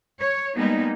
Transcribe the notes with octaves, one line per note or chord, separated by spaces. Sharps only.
C#5
G3 G#3 A#3 B3 D#4